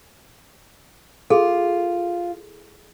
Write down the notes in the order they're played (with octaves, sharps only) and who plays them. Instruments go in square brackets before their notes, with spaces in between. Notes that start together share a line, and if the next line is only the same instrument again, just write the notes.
[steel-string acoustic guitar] F4 [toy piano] G#4 A4